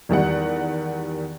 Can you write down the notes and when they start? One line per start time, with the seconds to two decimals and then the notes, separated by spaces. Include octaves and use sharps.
0.09 E2 D#3 G3 F#5